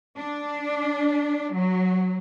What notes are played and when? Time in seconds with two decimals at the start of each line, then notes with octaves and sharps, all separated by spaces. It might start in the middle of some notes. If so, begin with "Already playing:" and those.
0.17 D4
1.54 F#3